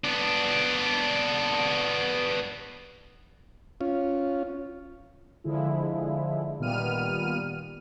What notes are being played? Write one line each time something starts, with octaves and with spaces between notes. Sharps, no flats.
B3 D4
C#4 F4
D3 F3 G#3 E4
A#2 D#3 G3 B3 F6 D#7